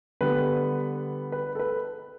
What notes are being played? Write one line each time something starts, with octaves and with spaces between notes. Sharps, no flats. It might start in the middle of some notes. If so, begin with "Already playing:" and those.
D3 G3 B3 B4
B4
A4
B4